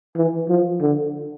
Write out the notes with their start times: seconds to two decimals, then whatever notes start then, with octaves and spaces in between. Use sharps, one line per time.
0.17 E3
0.49 F3
0.81 D3